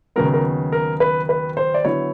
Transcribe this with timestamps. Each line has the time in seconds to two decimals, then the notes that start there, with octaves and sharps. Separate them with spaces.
0.16 D#2 C#3 F#3 B3 A#4
0.34 A#4
0.72 A#4
1.00 B4
1.29 B4
1.57 C5
1.74 D5
1.85 D3 F#3 B3 E4 C#5